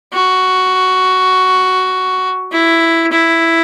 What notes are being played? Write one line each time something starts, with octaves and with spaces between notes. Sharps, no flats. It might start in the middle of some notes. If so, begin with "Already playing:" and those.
F#4
E4
E4